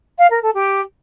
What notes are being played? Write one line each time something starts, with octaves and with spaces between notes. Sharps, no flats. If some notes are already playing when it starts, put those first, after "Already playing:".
F5
A#4
A4
G4